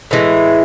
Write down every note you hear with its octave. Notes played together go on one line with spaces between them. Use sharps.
A2 E3 G#3